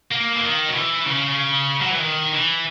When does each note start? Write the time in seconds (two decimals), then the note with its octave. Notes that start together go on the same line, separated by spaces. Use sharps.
0.12 A#3
0.37 E3
0.43 D#3
0.70 F#3
0.75 E3
1.06 C#3
1.81 F#3
1.91 E3
2.00 D#3
2.33 E3